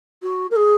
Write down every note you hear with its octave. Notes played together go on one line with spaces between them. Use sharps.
F#4
A#4
G#4